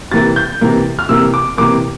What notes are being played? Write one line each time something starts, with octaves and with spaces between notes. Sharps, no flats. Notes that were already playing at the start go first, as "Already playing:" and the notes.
C3 E3 A#3 A6
G6
C3 E3 A#3
F6
C3 E3 A#3 E6
D6
C3 E3 A#3 D6